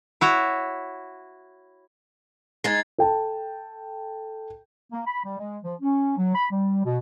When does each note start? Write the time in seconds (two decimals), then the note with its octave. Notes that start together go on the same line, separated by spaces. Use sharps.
0.21 E4 F#4 C#5
2.64 G#3 D#4 G#6 A6 C7
2.98 A4 G5 A5
4.92 A#3
5.07 B5
5.24 G3
5.39 G#3
5.64 F3
5.81 C#4
6.17 F#3
6.35 B5
6.51 G3
6.85 B2